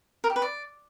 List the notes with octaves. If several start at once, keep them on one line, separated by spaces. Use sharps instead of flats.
A#4
G4
B4
D5